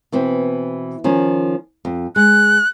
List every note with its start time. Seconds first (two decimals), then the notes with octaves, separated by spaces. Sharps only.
0.12 B2 E3 C4
1.04 D#3 F3 C#4
1.85 F2
2.16 G#3 F#6